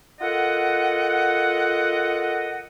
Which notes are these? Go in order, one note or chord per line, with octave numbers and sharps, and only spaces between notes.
F4 A4 A#4 D#5 F#5